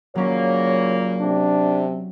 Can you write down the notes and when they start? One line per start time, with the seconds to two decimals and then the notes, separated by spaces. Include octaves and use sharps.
0.15 A#2 C#3 F#3 A#3 C#4 C#5
1.20 C3 D4